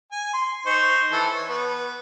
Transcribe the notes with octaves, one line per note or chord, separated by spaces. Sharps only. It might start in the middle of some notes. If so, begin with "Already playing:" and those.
G#5
C6
D#4 C5 C#6
E3 A4
C#5
B3